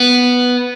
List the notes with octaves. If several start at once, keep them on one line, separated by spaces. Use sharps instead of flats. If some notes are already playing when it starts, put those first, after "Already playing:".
Already playing: B3